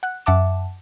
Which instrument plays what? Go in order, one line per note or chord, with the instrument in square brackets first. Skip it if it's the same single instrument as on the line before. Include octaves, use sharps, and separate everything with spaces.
[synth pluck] F#5 F#6
F#2 E5 F#5 A5 D6 E7